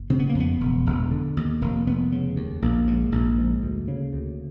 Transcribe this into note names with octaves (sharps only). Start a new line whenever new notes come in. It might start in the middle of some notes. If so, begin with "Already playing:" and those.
Already playing: F#1
C#3 C4
B3
A#3
F2
B3
E1
E1
D3
D#2
F1 A#3
F1 B3
C#3
D#2
A#1 A#3
G#2
A#1
G#2
D2
C#3
D2